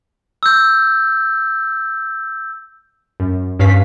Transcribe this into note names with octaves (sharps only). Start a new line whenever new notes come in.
E6 G6
F#2
G2 C#4 F5 B6